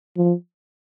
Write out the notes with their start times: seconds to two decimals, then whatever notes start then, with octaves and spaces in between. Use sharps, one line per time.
0.17 F3